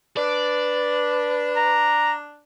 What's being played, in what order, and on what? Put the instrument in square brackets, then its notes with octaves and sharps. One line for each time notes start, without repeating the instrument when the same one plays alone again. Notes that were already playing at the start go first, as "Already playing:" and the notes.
[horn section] D4 [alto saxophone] B4 [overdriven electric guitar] D5
[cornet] A#5